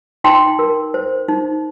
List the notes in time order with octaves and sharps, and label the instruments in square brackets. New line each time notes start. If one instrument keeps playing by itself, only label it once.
[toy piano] D#4 G5 C6
A#4
C5
D#4